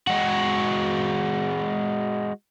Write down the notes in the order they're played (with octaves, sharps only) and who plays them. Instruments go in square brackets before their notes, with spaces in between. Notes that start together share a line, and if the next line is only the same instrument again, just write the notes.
[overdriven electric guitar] G#3 F#4